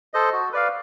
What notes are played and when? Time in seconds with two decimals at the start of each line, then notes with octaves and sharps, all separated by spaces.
0.14 A4 C5 D#5
0.33 F#4
0.53 B4 D5 F5